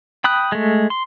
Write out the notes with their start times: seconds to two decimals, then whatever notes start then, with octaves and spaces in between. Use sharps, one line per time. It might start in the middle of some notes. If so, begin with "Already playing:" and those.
0.24 G5 B5 D#6 F#6
0.52 G#3 A3
0.90 C6